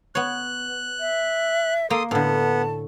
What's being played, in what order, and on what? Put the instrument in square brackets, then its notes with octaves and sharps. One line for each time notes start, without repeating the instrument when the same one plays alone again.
[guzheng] B3 C#5 [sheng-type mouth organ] F#6
[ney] E5
[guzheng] A#3 [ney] A4 [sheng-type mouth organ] C6 D#6
[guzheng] A2 D3 [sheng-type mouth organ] B3 [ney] A5